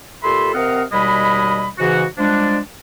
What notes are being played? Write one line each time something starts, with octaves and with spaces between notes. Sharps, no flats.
A#2 G4 A4 E5 B5 C6
C3 C4 A#4 D#5 F5 F#5
D#2 B2 G3 G#3 D#5 B5
G#2 C#3 E3 F#4
F3 G3 G#3 D4